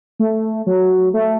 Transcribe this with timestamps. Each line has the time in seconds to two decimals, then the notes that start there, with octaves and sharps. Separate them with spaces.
0.20 A3
0.66 F#3
1.14 A3